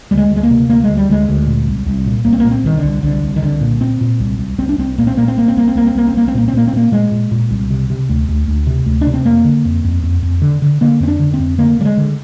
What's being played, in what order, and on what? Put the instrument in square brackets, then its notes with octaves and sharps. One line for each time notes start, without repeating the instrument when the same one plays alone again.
[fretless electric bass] D2 G3
G#3
D2
G#3
A#3
C3
D2 A#3
D2 G#3
G3
D2 G#3
D2
A#2
C2
C2
A#2
C2 A#3
C4
A#2 A#3
C4
C2 D#3
D3
C2
C2 D3
C2
D#3
C2 D3
A#2
A#2 C4
A#2
C2
C2
C2 C4
D4
C2 C4
A#2 A#3
C4
A#2 A#3
C4
C2 A#3
C4
C2 A#3
C4
C2 A#3
C4
C2 A#3
C4
C2 A#3
C4
A#2 A#3
C4
A#2 A#3
C4
A#2 A#3
A#2 G#3
A#2
A#2
C2
C3
C3
D2
D2
D2
C3
D2
D4
C3
C4
F2 A#3
D3
F2
F2
F2
F2
D3
D3
D3 A#3
F2 C4
D4
D3
C4
F2
D3 A#3
D3 G3
G#3
D3